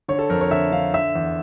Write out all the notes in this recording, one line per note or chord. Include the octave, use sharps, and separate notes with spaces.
D3 C#5
A4
F2 A#4
C#5
D3 E5
D3 F5
D3 E5
E2